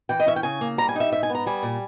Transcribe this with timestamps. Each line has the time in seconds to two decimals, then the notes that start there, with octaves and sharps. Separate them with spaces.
0.09 E3 G5
0.20 D#5
0.26 C#4 E5
0.36 G5
0.43 C#3 G#5
0.61 A#3
0.78 G3 A#5
0.89 G#5
0.95 D#4 E5
1.11 G#2 E5
1.23 G#5
1.30 B3
1.35 A#5
1.46 G3 G#5
1.63 A#2